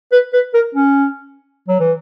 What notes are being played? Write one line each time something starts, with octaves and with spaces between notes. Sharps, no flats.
B4
B4
A#4
C#4
F#3
E3